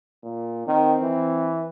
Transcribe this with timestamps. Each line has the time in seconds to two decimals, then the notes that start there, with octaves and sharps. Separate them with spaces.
0.24 A#2
0.67 D#3 C4
1.02 E3